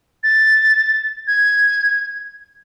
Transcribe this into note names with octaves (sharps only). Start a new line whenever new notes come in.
A6
G#6